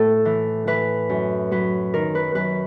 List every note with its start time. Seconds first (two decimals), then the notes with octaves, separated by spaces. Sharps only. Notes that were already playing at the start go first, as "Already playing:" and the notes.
Already playing: A2 A4
0.25 E3
0.67 E3 B4
1.09 F#2
1.51 F#3 B4
1.94 D#3 A#4
2.15 B4
2.35 F#2 B4